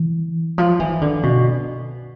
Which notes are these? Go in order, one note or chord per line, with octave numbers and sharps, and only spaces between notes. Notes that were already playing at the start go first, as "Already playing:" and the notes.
Already playing: E3
F3
E3
D3
B2